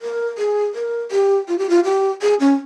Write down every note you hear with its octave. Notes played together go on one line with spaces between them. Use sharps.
A#4
G#4
A#4
G4
F4
G4
F4
G4
G#4
C#4